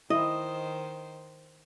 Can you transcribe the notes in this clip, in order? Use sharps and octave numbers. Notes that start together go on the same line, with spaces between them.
D#3 E4 C5 D#5